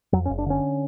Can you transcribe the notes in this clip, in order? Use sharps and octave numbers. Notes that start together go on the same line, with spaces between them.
F2 F#3
C#4
F#1
D4
D3 C#4